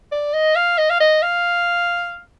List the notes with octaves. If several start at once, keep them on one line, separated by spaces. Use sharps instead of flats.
D5
D#5
F5
D#5
F5
D#5
F5